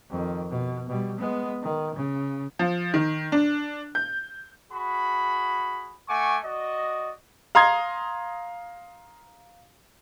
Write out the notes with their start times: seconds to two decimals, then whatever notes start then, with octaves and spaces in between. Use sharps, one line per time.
0.10 F2 D#3
0.51 B2
0.89 B2 G3
1.19 G#3 B3
1.63 D#3
1.95 C#3
2.59 F3
2.94 D#3
3.32 D4
3.95 G6
4.72 F#4 G#4 B5
6.08 A3 F#5 G#5 C#6 D6
6.44 F#4 D5 D#5
7.55 F5 A#5 C6 D#6 G#6